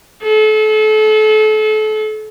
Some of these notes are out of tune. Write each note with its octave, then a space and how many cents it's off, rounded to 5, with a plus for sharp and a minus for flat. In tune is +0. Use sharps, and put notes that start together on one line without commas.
A4 -35